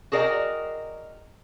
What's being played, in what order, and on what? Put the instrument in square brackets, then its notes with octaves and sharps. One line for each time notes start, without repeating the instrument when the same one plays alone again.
[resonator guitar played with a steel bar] F#4 G#4 A#4 D5 D#5 G5